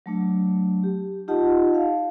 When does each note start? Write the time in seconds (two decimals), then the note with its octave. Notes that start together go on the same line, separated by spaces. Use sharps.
0.06 F#3 A3 D4
0.83 G4
1.28 D#4 F4 G4 D#5 F#5 A5
1.74 F5